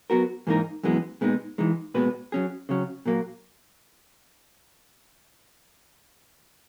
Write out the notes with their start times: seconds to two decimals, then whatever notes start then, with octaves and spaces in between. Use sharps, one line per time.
0.10 F#3 B3 F#4 A#4
0.47 G#2 E3 A#3 D#4 A#4
0.83 F#2 E3 G#3 B3
1.21 A#2 G#3 B3 D#4
1.58 E3 G#3 D#4
1.94 A#2 G#3 B3 F#4 B4
2.32 F#3 C#4 G#4
2.69 C#3 F#3 C#4
3.06 A#2 F#3 A#3